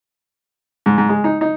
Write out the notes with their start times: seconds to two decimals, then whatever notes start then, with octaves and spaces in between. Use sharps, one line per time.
0.86 G#2
0.98 G#2
1.09 G#3
1.24 D#4
1.41 D#4